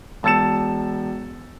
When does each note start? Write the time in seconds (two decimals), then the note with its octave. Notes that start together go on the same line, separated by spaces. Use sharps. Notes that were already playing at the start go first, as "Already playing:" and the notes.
0.23 E1 A5 E6 A6 C#7 E7